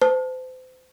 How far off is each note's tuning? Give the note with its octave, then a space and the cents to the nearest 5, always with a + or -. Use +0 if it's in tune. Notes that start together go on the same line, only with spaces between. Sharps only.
C5 -35 A5 +0